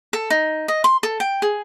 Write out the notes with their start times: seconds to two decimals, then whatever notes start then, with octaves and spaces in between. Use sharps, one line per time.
0.13 A4
0.30 D#4
0.68 D#5
0.84 C6
1.03 A4
1.20 G5
1.42 G#4